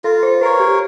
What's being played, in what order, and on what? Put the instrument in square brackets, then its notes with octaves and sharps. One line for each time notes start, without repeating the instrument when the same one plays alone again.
[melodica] F4 [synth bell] A4
[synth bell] C5
[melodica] A#4 C#5 [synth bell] B4
[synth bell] G4